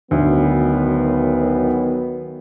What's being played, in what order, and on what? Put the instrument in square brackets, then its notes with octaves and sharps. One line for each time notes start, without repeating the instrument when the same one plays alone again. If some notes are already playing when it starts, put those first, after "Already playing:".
[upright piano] D2 [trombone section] D#3 F#3 B3